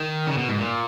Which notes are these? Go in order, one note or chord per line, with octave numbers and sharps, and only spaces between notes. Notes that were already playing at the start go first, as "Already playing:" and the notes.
Already playing: D#3
C#3
B2
G#2
A#2